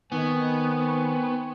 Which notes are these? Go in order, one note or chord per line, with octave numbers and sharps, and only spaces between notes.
D#3 B3 C4 G#5 C#6